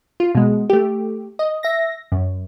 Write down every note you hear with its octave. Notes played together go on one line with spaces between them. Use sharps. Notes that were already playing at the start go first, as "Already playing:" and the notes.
F4
B2 G#3
A3 G4
D#5
E5 A#6
F#2